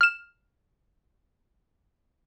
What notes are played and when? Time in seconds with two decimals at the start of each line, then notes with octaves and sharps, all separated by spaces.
0.01 F6 E7